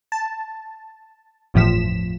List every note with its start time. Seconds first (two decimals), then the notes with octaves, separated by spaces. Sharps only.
0.12 A5
1.54 G1 E2 A2 F3 B6 E7